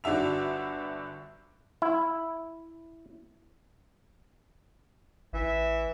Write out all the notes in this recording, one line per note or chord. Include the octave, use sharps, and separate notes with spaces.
G1 D4 F#4 E5 F7
E4
A1 E3 E5